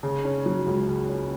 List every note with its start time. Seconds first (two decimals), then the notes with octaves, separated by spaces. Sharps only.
0.03 C#3
0.25 C#4
0.46 F#3
0.66 C#2
0.88 C#3
1.09 C#4